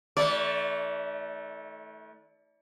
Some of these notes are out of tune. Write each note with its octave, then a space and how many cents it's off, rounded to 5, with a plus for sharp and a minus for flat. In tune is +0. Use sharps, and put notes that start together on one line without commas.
E3 -45 A3 -10 D5 -35